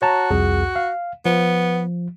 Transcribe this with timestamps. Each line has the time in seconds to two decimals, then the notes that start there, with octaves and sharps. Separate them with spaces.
0.02 F#4 C#5 A5 A#5
0.31 C2 F2 G#4
0.76 F5
1.26 F3 B3